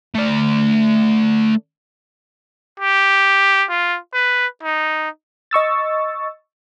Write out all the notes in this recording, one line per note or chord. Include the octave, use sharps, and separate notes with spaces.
A3 D5
G4
F4
B4
D#4
D#5 C#6 E6 A6